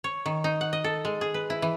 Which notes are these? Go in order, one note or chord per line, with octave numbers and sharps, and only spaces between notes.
C#5
D#3
D#4
F#5
D#5
A4
G#3
G#4
B4
E4
E3